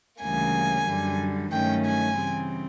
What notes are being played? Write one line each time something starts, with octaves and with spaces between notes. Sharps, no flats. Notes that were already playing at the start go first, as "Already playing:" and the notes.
D2 C#3 E3 G3 A#3 G#5
F#2 D3 G3
G2 D#3 F#3 A3 C#4 G5
G#5
C#3 E3 G3 C4